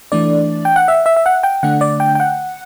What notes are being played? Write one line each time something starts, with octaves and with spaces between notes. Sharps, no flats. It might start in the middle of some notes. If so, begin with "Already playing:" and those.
E3 A3 D4 D5
G5
F#5
E5
E5
E5
F#5
G5
D3 A3 D4 F#5
D5
G5
G5
F#5